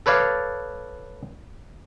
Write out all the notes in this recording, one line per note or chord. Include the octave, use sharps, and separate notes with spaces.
A4 B4 C#5 D5 F5